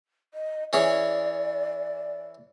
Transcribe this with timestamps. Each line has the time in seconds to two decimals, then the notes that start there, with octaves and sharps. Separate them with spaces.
0.34 D#5
0.73 E3 C#4 G#4 D5